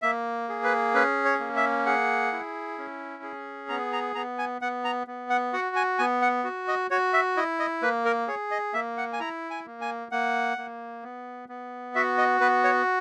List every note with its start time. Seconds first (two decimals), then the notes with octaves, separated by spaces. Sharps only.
0.02 A#3 E5
0.49 G#4
0.64 B4
0.94 C#4 B4
1.25 C#5
1.40 A#3
1.56 E5
1.86 G#4 F#5
2.32 E4
2.78 C#4
3.23 G#4
3.69 B3 A#5
3.93 A#5
4.15 B3 A#5
4.38 G#5
4.61 B3 F#5
4.84 A#5
5.07 B3
5.30 F#5
5.53 F#4 F#5
5.76 G#5
5.99 B3 G#5
6.21 F#5
6.44 F#4
6.68 D#5
6.90 F#4 C#5
7.13 E5
7.37 E4 D#5
7.60 D#5
7.82 A#3 B4
8.05 A#4
8.28 G#4 C#5
8.51 D#5
8.73 A#3 E5
8.98 F#5
9.13 G#5
9.20 E4 A#5
9.51 G#5
9.66 A#3
9.81 G#5
10.12 A#3 F#5
10.57 A#3
11.03 B3
11.49 B3
11.95 F#4 E5
12.18 D#5
12.41 B3 B4
12.64 C#5